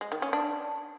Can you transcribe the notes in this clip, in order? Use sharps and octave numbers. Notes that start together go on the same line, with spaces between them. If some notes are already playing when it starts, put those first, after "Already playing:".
G#3
D#3
C#4
D4